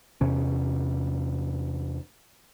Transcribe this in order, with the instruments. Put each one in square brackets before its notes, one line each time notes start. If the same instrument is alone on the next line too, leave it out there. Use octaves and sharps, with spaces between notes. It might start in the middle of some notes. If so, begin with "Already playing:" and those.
[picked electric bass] E2 C3 C#4